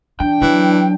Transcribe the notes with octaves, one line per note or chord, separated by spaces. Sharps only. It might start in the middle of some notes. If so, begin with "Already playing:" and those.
E3 D4 G5
E3 F#3